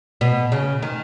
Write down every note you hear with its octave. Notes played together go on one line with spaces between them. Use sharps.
B2
C#3
D#3